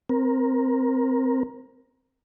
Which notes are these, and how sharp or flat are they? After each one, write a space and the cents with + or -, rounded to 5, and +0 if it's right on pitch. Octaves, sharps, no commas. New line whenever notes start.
C4 -5 A#4 +15